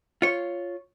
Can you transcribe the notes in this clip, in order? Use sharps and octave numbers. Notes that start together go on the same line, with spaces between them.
F4 C#5